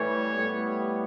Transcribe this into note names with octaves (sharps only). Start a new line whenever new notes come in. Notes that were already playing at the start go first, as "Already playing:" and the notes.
Already playing: A2 E3 G3 C#5
A2 G3 B3